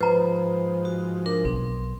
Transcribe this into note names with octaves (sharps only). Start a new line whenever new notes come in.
G#2 F3 B4 C5 A#5 B5
F#4
D4 A#4
B1 C4